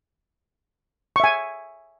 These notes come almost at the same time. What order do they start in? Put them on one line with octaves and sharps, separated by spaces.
C#6 E5 G#5